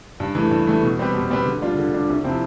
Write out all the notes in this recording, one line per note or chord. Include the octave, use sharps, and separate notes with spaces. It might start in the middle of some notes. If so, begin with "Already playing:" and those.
G2
E3 A3
G2
E3 A3
B2
G3 C4 G4 B4
B2
G3 C4 G4 B4
D3
G3 D4 F4
D3
G3 D4 F4
C2
C3 F3 C4 E4